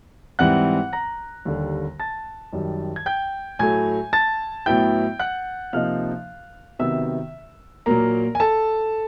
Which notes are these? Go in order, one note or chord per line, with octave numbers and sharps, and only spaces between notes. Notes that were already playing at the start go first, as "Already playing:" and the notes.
G#2 E3 G3 C4 F#5 F#6
A#5 A#6
D#2 D3 G3
A5 A6
F#2 D#3 G3
G#6
G5 G6
A2 F#3 A3 G#5 G#6
A5 A6
A2 F#3 B3 E4 G5 G6
F#5 F#6
C3 F3 A#3 D#4 F5 F6
C3 D#3 F#3 B3 E5 E6
A#2 F#3 A#3 A#4 A#5
G#5
A4 A5